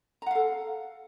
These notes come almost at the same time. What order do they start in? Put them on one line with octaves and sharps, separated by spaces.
A#5 F#5 F5 A4